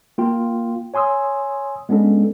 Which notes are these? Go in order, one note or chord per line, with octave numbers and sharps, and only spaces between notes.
A#3 F4 G5
C#5 G#5 C6 D#6 E6
G#3 B3 C#4 D4 A4